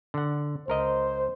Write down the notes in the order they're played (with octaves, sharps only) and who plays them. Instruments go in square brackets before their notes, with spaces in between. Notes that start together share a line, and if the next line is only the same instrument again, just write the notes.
[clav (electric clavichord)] D3 F#5
[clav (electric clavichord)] C#2 A#4 D#5 [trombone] C5